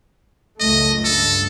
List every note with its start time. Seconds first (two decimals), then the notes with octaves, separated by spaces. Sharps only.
0.60 C#2 F#2 A3 D#5
1.05 G2 A4